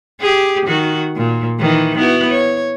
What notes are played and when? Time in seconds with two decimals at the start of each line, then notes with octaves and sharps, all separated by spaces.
0.20 G4 G#4
0.66 D#3 F#4
1.16 A#2
1.59 D#3 E3
1.97 B3 E4 F#4
2.30 C#5